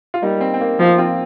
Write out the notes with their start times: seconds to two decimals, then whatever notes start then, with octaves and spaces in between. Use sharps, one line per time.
0.14 F4
0.22 G3 A#3 D#4
0.41 C4
0.54 C4
0.61 A#3
0.79 F3 A#3
0.98 C4 F4